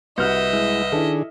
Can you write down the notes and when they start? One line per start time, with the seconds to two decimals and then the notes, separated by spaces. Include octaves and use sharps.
0.18 C2 F#4 B4 D#5 E5 F6 G6
0.53 G#3 E4
0.92 D#3 D4 E4 G#4 A4